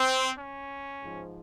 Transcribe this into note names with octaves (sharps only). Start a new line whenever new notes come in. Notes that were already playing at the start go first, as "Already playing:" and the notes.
Already playing: C4
C#4
G#2 F3